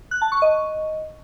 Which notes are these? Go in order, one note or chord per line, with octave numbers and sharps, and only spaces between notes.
F#6
A5
C#6
D#5